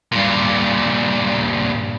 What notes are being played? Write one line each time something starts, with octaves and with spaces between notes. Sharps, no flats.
G2 A#2